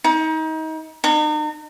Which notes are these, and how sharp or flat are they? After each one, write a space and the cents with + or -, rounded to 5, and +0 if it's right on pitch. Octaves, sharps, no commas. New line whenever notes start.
D#4 +30
D#4 -40